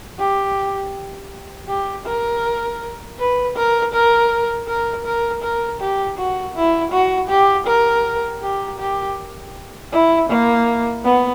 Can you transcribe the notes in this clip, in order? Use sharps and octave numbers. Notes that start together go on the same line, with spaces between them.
G4
G4
A#4
B4
A#4
A#4
A#4
A#4
A#4
G4
F#4
E4
F#4
G4
A#4
G4
G4
E4
A#3
B3